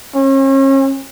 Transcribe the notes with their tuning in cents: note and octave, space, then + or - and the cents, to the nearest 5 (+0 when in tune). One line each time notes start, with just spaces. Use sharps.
C#4 -40